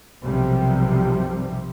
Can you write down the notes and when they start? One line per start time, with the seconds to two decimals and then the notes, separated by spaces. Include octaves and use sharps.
0.22 B1 F#2 C3 F3 G3